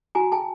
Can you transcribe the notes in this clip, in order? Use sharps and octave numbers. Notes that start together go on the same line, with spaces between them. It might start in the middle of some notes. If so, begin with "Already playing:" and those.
F#4 G#5 A#5
G5 A5